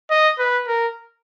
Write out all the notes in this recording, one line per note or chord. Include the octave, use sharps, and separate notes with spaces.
D#5
B4
A#4